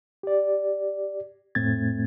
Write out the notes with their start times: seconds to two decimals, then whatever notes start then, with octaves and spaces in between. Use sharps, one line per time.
0.23 G4 D5
1.55 F2 A2 A3 C4 G#6 A6